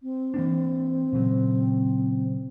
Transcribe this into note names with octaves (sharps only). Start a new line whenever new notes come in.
C4
E3 A#3 D4
A#2 C#3 F#3